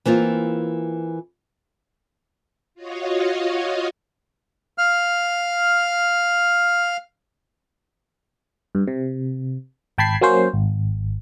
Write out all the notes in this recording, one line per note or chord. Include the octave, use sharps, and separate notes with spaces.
E3 A#3 C4 F4
F4 F#4 C#5 D#5 F5
F5 F6
G2
C3
G#1 G5 A5 B5 G#6 C7
F#3 A#3 C#4 C5
G#1